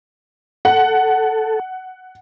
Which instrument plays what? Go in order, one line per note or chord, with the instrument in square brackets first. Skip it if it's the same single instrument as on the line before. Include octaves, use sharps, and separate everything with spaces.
[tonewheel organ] A4 [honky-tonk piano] F#5